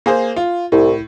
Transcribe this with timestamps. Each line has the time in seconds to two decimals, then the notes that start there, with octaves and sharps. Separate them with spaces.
0.06 A#3 G#4 C5
0.36 F4
0.72 C2 A2